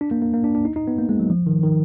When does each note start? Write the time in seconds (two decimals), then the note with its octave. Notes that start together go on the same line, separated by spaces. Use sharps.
0.01 D4
0.11 A#3
0.22 A#3
0.33 A#3
0.44 D4
0.55 D4
0.65 D#4
0.76 D#4
0.87 B3
0.99 A#3
1.09 G#3
1.20 F#3
1.30 F3
1.47 D#3
1.63 D#3